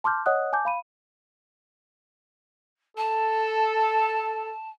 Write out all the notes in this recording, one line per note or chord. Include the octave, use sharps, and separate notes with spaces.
A5 C6 D6 F6 G6
C#5 D#5 F#5 D#6 F#6
G#5 A5 D6 G6
F5 B5 D#7
A4 A5